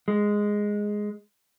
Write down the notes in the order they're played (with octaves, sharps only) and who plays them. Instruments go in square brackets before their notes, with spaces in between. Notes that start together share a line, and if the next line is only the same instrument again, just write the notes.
[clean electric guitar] G#3